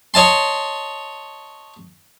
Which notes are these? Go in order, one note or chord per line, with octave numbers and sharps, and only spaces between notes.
C#5 D#5 A5 C6